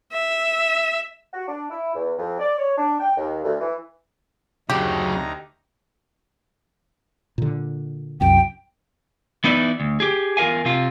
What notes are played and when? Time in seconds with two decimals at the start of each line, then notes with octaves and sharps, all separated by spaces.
0.12 E5
1.34 F#4
1.48 D4
1.71 E4
1.96 E2
2.18 F2
2.39 D5
2.58 C#5
2.78 D4
3.00 G5
3.17 D#2
3.44 D2
3.61 E3
4.70 D2 C#3 F#3 D#4 G4 A#5
7.38 A#2 D3
8.21 C2 F#2 G5
9.44 E3 B3 D#4 E4 B4 D5
9.80 D2
10.00 G4 G#4
10.37 E2 F4 A#4 F5 G#5
10.65 C3 F4